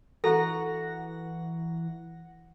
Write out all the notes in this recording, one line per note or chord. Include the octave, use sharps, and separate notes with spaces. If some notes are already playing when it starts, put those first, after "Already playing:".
E3 F#4 A4 F#5 A#5 A#6